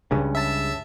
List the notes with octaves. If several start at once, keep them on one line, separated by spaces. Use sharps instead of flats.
C#2 G2 C#3
E5 A5